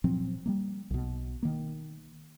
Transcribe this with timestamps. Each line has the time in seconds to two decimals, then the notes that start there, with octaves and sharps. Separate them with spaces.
0.04 A#2 F3 F#3 C4
0.46 G3 G#3 A#3
0.91 B1 B2
1.43 D#3 A#3